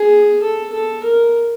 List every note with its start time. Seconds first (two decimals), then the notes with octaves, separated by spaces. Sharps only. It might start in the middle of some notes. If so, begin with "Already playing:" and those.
Already playing: G#4
0.42 A4
0.73 A4
1.04 A#4